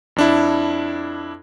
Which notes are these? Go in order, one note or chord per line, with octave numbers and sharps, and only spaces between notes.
F2 D4 E4